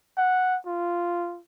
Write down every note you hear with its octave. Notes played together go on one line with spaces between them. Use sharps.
F#5
F4